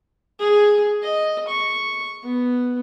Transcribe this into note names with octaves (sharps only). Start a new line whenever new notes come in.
G#4
D#5
C#6
B3